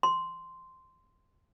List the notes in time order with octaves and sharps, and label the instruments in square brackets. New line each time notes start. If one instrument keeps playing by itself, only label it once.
[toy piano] C6